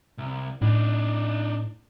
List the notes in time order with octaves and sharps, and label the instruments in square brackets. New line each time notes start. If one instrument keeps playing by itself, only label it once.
[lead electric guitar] C2
[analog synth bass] A2 [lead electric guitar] D4 D#4